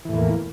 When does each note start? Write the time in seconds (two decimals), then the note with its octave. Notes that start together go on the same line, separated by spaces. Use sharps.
0.05 E3
0.09 A2
0.13 E2
0.16 A#3